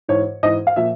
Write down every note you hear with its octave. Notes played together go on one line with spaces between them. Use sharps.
G#2 E3 C#5
G#2 E3 D#5
F5
A#2 F3 E5